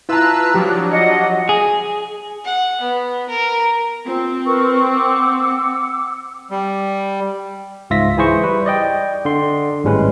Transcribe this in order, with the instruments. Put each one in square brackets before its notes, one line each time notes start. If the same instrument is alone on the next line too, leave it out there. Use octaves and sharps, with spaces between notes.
[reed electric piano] E4 A5 [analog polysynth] F4 B4 E6 [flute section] A#5 F#6
[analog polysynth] F3 F#3 D4 [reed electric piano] G4
[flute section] D#5 F#5
[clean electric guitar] G#4
[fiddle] F#5
B3
A#4
[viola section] C4 [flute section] F4
[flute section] A#4 B4 C#6
F#5 D6 E6
[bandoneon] G3
[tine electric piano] C#2 G#2 F4 E5 A#6 B6
E3 E4 G#4 C5 C#6
G3 B4
D5 D#5 G5
D3 C6
G#1 A2 G3 G#3 C#4 B4